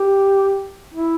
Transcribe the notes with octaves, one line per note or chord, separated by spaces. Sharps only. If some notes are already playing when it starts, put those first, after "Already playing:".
Already playing: G4
E4